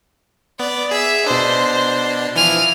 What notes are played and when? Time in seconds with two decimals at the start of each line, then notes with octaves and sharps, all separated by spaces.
0.59 B3 D5
0.91 G#4 E5
1.26 B2 D4 C5
2.36 E3 F3 G#5 F6